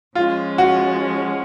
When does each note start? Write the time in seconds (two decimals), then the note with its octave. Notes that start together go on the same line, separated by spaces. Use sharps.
0.15 F3 G#3 C#4 F4
0.58 F#4